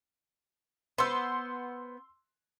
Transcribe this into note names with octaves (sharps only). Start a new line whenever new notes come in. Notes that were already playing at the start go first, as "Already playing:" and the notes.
B3 C5 C6 E6